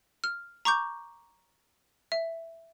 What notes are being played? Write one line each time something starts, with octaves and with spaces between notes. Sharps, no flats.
F6
A#5 C#6 D6 G6
E5